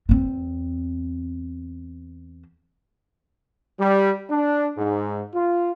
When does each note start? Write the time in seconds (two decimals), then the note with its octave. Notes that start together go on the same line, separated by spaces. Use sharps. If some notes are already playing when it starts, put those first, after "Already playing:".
0.09 E2 C4
3.79 G3
4.30 D4
4.77 G#2
5.33 F4